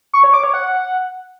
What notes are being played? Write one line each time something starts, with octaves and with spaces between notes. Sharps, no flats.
C#6
C#5
D6
C#5
F#5